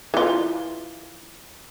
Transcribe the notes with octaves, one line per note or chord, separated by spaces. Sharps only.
E3 F4